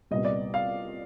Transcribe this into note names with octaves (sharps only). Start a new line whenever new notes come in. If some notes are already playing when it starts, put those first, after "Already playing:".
C2 A#2 G3 B3 D#5
D5
F5